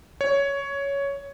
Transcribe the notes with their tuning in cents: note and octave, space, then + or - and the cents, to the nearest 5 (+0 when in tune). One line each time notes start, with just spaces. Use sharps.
C#5 +10